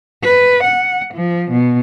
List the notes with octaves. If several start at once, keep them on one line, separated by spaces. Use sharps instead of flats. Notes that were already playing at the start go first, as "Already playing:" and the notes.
B4
F#5
F3
B2